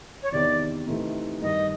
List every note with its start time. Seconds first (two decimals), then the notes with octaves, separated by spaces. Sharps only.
0.23 C#5
0.32 E2 C3 D#3 D5
0.87 C3 E3 A3 C4 D#4
1.42 G2 D#3 G3 D#5